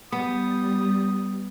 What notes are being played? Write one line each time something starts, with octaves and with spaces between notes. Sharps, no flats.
G3 B3 D#6